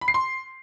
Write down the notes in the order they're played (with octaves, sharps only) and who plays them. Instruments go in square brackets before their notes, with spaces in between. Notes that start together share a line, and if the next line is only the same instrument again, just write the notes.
[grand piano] B5
C7
C6